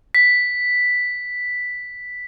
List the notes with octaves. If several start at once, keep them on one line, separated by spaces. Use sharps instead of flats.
B6